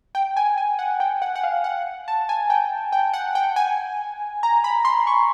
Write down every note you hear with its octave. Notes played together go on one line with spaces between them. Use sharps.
G5
G#5
G#5
F#5
G5
F#5
F#5
F5
F#5
A5
G#5
G5
G5
F#5
G5
G#5
A#5
B5
C6
C#6